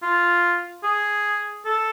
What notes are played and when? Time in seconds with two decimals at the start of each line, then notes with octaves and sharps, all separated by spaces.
0.03 F4
0.84 G#4
1.65 A4